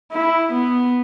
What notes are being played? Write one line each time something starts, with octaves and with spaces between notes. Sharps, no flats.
E4
B3